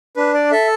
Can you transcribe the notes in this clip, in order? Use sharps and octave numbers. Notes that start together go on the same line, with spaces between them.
D4 B4
D5
A4 E5